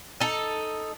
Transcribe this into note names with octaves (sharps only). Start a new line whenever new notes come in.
D#4 A4